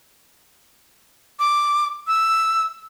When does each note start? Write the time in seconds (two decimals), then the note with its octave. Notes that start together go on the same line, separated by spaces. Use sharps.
1.39 D6
2.07 E6